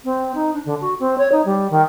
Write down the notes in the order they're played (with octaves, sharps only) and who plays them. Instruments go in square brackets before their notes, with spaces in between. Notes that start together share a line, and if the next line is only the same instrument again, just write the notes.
[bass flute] C4
D#4
D4
D3
F#4
C4
C#5
D#4
G3
D#3